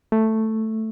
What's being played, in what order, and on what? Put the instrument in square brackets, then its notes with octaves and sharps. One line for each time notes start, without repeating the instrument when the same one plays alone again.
[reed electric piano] A3